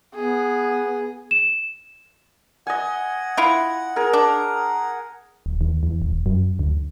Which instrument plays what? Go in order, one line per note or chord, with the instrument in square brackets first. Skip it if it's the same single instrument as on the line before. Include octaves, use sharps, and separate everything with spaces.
[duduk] B3 [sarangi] G#4
[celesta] E7
[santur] D#5 G#5 [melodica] F#5
[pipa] E4 F4
[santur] G#4 A#4
[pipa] D4
[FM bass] D1
D#2
E2
D#1
F#2
D2